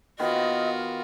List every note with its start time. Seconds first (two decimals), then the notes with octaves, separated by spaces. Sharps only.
0.19 D#3 B3 F4 F#4 D#5